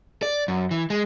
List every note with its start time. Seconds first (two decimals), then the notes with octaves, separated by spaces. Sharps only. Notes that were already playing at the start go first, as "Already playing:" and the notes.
0.23 D5
0.48 F#2
0.71 E3
0.90 G#3